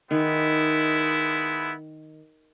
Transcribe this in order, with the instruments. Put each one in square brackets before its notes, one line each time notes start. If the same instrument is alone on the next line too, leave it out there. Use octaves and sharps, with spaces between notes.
[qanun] D#3 [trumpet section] G#3 B3 E4